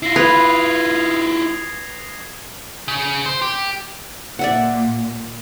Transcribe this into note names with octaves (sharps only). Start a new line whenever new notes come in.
E4 F4 A#6 C7
B4 D#6 G#6 F7
C#3
C5
G4
A#2 D5 E5 F#5